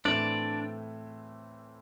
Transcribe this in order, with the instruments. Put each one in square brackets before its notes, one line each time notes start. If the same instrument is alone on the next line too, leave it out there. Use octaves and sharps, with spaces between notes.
[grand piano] A2 E3 A3 C4 E4 [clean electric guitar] D4 D5